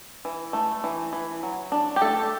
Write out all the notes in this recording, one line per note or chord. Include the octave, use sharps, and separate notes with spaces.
E3
A3
E3
E3
F#3
D4
G4
A3 A4